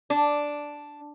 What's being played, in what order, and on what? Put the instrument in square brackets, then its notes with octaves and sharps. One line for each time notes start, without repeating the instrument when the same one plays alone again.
[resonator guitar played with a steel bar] D4